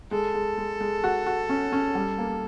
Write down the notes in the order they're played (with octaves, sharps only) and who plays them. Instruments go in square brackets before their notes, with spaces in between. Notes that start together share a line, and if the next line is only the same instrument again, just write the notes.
[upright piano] G#3 [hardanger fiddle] A4
[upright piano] G#3
G#3
G#3
F#4
F#4
C#4
C#4
G3
A#3